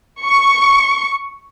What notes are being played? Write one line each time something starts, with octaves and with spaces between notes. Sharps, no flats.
C#6